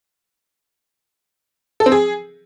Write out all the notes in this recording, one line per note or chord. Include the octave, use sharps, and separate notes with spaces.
A4
C4
G#4